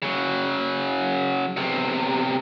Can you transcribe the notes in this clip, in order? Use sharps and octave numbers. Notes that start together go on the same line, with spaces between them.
C#3 F#3
B1 C3